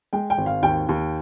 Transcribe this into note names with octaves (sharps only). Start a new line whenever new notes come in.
G#3 G5
G5
G#1
F5
D#2 G5
D#2